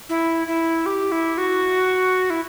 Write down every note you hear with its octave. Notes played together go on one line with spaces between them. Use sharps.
E4
E4
G4
E4
F#4
E4